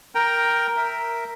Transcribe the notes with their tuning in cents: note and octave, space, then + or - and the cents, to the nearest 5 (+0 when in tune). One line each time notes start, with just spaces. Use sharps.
A#4 +5 G5 +0 A#5 +0
A#4 +0 E5 +0